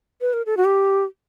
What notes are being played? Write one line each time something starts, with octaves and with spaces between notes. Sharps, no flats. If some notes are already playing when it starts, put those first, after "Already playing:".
B4
A#4
A4
F#4
G4